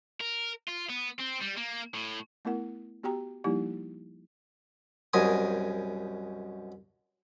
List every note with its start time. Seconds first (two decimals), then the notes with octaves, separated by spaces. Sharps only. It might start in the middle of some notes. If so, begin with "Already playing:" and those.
0.20 A#4
0.68 F4
0.89 B3
1.19 C4
1.41 G3
1.57 A#3
1.94 A2
2.45 A3 B3 E4 A#4 F#5
3.03 B3 F#4 G4 G5 A#5
3.44 F3 G3 A#3 D#4 E4 G4
5.13 C2 F#2 B2 A#4 G#5 D#6